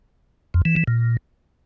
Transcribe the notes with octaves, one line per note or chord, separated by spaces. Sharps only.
F2
E3
E3
A#2